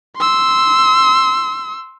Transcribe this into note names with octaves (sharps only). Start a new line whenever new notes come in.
C6 E6